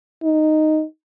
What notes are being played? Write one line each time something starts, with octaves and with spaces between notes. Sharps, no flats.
D#4